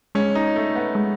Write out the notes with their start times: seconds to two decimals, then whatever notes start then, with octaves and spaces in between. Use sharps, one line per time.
0.15 G#3 C#4
0.35 D#4
0.56 A3
0.75 B3
0.95 G#3